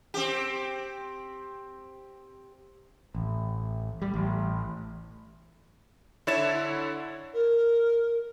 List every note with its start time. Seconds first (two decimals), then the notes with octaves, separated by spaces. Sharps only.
0.14 C4 G4
3.15 A1
4.02 G3
4.14 A1
6.27 D3 E4 C#5 A6 E7
7.33 A#4